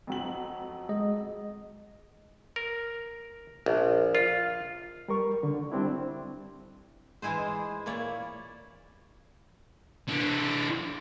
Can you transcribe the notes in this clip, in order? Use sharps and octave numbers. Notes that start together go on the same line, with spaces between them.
F2 F#3 F#7
G#3 D#5
A#4
A#1
F4
G3 A#4 C#6
D3
G3 C4 D4 E4
E3 G#3 E4 G#4 C5
A#2 A#3 E4 C#5 D5
E3 D4